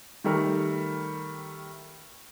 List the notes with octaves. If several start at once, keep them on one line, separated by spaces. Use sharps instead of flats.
D#3 G3 A3 A#4